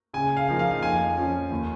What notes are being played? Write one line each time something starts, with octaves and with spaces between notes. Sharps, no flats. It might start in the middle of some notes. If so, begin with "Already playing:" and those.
C#3 G#5
F5
F3 A#3 D#4
F5
F2 G#5
F3 C#4
D#2